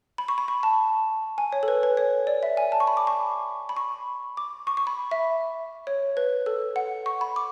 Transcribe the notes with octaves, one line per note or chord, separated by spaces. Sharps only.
B5
C#6
B5
C#6
A5
G#5
C#5
A4
B4
B4
C#5
D5
E5
G#5
A5
C#6
B5
D6
C#6
B5
C#6
D6
C#6
C#6
B5
E5
C#5
B4
A4
F#5
C#6
B5
D6